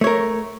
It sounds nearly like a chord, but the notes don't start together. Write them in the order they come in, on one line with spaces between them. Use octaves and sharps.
A3 C#5 A#4